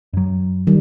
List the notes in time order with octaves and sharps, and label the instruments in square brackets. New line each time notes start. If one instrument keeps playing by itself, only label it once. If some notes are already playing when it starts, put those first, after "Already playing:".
[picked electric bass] F#2 F#3
[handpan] D#3 G3